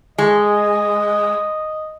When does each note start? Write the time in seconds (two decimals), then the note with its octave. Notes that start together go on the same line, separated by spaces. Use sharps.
0.18 G#3 D#5